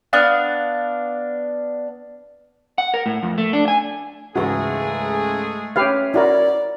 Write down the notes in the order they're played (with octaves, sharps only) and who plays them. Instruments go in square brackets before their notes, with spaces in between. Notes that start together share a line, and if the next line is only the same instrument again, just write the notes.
[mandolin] B3 D4 F5 F#6
[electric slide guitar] F#5
A#4
A2
F2
A3
D4
G#5
[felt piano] C#2 G#2 E3 [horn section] G#3 A3 G#4 [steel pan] F#4
[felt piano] C#4 C#5 E5 [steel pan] G4 B4 F5
[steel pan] E4 F#4 A#4 [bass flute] D5